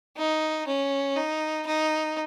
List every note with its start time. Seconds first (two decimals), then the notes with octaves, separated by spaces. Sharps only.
0.17 D#4
0.67 C#4
1.16 D#4
1.66 D#4